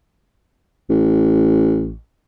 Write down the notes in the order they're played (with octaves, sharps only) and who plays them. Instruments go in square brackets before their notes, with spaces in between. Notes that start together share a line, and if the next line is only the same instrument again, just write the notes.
[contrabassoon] A1